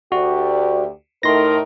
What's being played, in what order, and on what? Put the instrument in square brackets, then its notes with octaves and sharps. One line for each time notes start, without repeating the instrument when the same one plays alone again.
[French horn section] D2 G4 D5 [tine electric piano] F#4
[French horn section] A2 D#4 A#4 [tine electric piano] C6 A#6